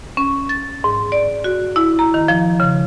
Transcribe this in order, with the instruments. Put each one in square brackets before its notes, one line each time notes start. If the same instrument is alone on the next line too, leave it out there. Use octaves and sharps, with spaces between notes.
[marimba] C#4
A6
G#2
D5
F#4
E4
A#5
D#3
F3
C#3